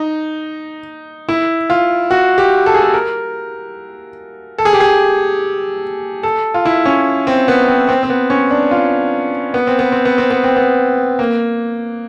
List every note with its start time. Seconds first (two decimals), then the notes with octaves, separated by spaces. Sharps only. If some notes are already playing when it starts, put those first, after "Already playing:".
Already playing: D#4
1.29 E4
1.70 F4
2.11 F#4
2.38 G4
2.66 A4
2.74 G#4
2.82 A4
2.94 A#4
4.58 A4
4.65 G#4
4.73 G4
4.80 G#4
6.23 A4
6.54 F4
6.65 E4
6.86 C#4
7.27 C4
7.48 B3
7.68 C4
7.89 C4
8.03 C4
8.10 B3
8.30 C#4
8.51 D4
8.71 F4
9.54 B3
9.67 C4
9.79 B3
9.92 C4
10.05 B3
10.18 C4
10.31 B3
10.44 C4
10.56 B3
11.19 A#3